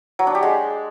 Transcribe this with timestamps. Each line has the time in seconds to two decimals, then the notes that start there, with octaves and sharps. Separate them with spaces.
0.19 F#3
0.27 D4
0.35 G4
0.43 G#3